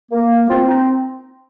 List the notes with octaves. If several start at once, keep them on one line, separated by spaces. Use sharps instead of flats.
A#3
C4 F4
D#4